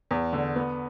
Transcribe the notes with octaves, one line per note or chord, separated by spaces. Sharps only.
E2
D3
B3